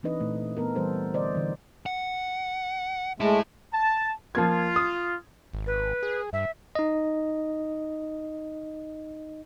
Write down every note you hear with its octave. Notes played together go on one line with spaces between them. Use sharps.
E3 C4 D4 D#4 B4 D#5
A#2 A3
A3 B3 A4 A#4
E3 G3 A4 C5
D3 C5 D5 D#5
D3 E3
F#5
G#3 A3 E4 A5
A5
F3 A#3 F4 G#6
D#6
G#1
B4
G#4
G2 E5
D#4 D#5